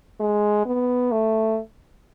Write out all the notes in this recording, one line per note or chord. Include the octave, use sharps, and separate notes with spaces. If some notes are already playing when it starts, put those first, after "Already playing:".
G#3
B3
A3